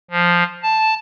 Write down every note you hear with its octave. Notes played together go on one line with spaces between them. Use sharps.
F3
A5